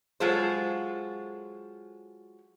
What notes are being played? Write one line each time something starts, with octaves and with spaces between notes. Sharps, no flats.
F#3 G#3 F4 A4 C5